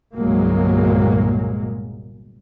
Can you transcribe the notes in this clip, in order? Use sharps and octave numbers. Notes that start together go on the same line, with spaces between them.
G1 C2 A#2 F#3 G#3 A#3